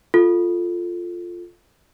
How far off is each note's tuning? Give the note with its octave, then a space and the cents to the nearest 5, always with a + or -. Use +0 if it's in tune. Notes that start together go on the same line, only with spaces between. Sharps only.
F4 +0 A4 +0